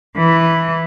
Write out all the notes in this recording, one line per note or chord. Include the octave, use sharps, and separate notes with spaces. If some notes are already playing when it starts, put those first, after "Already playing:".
E3